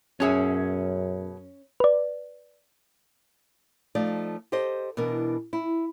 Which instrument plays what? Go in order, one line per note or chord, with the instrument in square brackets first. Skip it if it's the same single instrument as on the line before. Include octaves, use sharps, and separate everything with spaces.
[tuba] F#2 [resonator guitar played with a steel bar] B2 G#4 E5 [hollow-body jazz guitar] C#4
[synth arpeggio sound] B4 D5
[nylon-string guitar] F3 A3 D#4 D5
G4 A4 C5 D#5
B2 E3 D4 A#4
E4